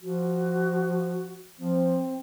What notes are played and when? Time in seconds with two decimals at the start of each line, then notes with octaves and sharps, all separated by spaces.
0.01 F3 F#4
1.59 F3 C4